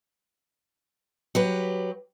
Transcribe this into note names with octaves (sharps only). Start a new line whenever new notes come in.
F#3 G4 B4